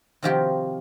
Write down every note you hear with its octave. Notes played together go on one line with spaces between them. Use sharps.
C3 D#3 F3 F#4 G4 A#4